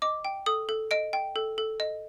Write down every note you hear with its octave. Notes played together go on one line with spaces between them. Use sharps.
D#5 D6
G5
A4 D#6
A4
D#5 D7
G5
A4
A4
D#5